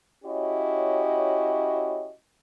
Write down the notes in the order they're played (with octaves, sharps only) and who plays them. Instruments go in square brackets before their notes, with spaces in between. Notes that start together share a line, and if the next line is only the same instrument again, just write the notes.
[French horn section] C#4 E4 F#4 G4 C#5 D#5